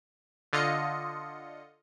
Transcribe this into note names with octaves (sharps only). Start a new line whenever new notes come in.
D3 F4 D#5 C#7